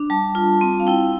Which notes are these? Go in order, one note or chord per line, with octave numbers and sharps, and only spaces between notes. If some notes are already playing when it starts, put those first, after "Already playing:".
Already playing: D4
G3 A5
F4
C4
F5
E4 G5